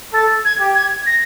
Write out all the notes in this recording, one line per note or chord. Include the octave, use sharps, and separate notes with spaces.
A4 A6
G#6
G4
G#6
A#6